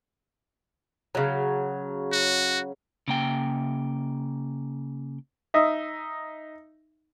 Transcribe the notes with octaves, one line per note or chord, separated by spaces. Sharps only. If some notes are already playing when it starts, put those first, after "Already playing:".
C#3 F#3
F#4
C#3 A#3 G5
D#4 D#5 E5